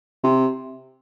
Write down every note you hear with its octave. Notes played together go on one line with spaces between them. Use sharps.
C3